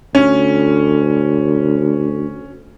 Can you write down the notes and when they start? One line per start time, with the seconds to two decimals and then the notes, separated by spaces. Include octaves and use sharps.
0.15 D2 C#4